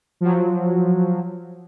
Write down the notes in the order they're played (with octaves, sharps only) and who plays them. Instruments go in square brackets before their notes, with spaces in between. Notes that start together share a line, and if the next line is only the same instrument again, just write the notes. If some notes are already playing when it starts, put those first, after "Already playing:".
[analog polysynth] F3 F#3